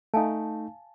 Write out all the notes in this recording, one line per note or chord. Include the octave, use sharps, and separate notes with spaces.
A3 D#4 F5 G#5 A5